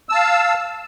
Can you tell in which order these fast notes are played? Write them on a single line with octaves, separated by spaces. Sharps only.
E6 A5 F5